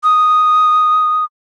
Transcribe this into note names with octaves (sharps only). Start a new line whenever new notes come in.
D#6